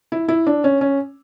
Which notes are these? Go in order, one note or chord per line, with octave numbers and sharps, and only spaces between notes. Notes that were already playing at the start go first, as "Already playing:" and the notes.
E4
E4
D4
C#4
C#4